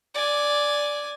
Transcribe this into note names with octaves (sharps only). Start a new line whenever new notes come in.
D5 G#5